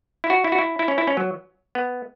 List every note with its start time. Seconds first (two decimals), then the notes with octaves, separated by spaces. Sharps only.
0.24 E4
0.30 F#4
0.44 E4
0.52 F#4
0.58 E4
0.79 E4
0.88 C#4
0.98 E4
1.07 C#4
1.17 F#3
1.75 B3